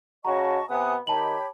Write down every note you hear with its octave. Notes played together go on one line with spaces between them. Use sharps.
C#3 C#4 F#4 D#5 A5 A#5 C#6
C3 B3 G#5 D#6 F#6
D#3 G4 C#5 A5 B5 F#7